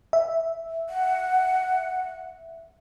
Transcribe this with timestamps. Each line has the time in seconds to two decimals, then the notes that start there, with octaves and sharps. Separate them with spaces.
0.13 E5
0.89 F#5